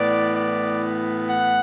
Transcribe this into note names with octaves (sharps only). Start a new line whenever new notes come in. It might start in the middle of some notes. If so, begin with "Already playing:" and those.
Already playing: A2 E3 B3 D5
D5
F#5